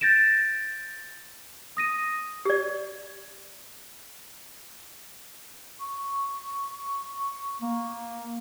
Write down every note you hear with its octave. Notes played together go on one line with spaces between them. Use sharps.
G6 A6 A#6 D7 E7
D#6 A#6 D#7
G4 D5
C#6
A#3